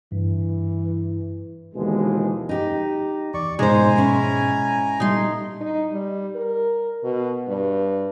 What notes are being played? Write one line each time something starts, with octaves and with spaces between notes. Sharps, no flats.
G2 E3
D#2 B2 D3 E3 F3 G#3
D#4 G4
E2 D5 C#6
G#2 B2 G#3 D#4 C5 G#5 A#5
C#4 E4
A#2 G3 A3 D#4 C6
D#4
G3
A#4
B2
G2